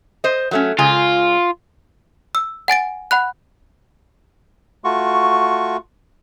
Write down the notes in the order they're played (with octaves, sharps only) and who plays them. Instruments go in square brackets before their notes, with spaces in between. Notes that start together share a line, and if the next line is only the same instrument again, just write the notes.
[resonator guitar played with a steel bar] C5 D#5
F#3 A3 C#4
[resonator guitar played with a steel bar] C#3 G#3 G#5 [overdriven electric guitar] F4
[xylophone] E6
F#5 G#5 A6 D7
F#5 B5 F#6
[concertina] A3 F4 F#4 C#6